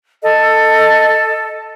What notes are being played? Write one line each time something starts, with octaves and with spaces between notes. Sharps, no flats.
A4 D#5